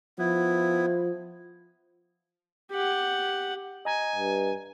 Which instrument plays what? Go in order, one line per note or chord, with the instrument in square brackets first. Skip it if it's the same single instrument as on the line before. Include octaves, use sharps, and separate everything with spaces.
[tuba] F3 [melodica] B3 E4
[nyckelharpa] G4 F#5
[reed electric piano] D#5 A#5 G#6 [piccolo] G#5
[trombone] G2